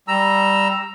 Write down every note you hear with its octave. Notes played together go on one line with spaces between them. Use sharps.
G3 A#5 E6